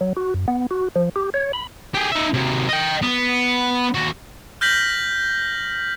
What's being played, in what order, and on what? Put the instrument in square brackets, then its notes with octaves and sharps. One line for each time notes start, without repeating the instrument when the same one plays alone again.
[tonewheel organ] F#3
F#4
F#2
B3
F#4
F3
G4
C#5
B5
[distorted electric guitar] G4 G#4
D#4 E5
C3 F#3
D#5 G5
B3
D#2 F#4
[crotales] F6 G6 A#6 B6 F#7